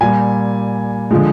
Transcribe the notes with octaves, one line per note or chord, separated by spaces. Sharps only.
A#2 G3 G#5
D3 F3 G#3